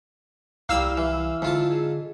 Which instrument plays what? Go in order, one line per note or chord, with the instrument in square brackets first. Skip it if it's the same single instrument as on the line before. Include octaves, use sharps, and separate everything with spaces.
[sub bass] C2 [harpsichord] G3 A#3 [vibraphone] E4 [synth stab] F5 E6
[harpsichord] E3
[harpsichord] G#2 F4 A5 [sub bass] D3
[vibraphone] G#4 D#5